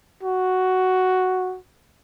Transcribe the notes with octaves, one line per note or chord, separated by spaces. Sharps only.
F#4